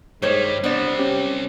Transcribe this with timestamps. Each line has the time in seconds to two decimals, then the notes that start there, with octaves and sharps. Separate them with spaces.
0.22 G2 D#3 G3 G#3 C5 C#5
0.64 G3 B3 C4 D4 C5 D5
0.99 C#4 G4